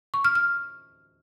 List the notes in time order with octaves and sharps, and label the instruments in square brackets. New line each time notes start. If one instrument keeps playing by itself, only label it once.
[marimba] C#6
F6
F6